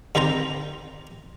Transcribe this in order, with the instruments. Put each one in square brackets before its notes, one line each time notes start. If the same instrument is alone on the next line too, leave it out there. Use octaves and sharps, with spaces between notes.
[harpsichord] G2 D#3 C4 C5 A#5